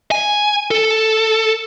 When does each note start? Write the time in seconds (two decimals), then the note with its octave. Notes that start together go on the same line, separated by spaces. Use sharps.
0.11 G#5
0.71 A4